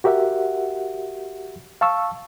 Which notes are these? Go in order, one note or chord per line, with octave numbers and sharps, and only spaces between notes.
F#4 G4 A#4 E5 F#5
F5 A5 C#6 E6